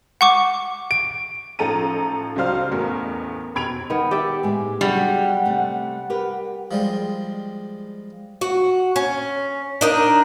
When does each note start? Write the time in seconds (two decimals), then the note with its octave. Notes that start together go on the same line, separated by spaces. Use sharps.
0.21 F#5 C#6 D6
0.91 D7
1.59 A1 F3 D#4 A4 A#5 D#7
2.36 C#2 F#3 G3 C5 F5 F6
2.71 A1 E2 A3 A#4
3.55 F1 B2 B5 G#6 D7 F7
3.90 D#3 B3
4.11 G4 D5 E5
4.43 A2 G#3 G#5
4.81 F#3 G3 D4 G#4 F#5
5.45 C3 A3
6.10 G4 A#4 B4
6.71 F3 G3 G#3
8.41 F#4
8.96 C#4
9.81 D4 D#4 A#4